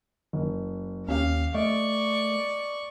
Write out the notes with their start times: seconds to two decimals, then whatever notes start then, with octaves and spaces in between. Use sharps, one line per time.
0.33 F#1
1.08 D#2 C#4 G4 F5
1.55 A3 D5 D#5 C#6